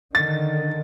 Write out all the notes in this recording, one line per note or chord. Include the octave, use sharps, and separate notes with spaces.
D3 D#3 A6